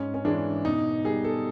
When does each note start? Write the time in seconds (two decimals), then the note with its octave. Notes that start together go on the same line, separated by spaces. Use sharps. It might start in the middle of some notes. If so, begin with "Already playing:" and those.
Already playing: G#2 C#4
0.14 C#4
0.24 E3 G#3 D4
0.65 B2 D#4
1.05 G3 G#4
1.24 A4